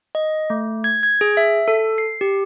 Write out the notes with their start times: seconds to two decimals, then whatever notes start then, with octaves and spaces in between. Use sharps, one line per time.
0.15 D#5
0.50 A3
0.84 G#6
1.03 G#6
1.21 G#4
1.37 E5
1.68 A4
1.98 C7
2.21 G4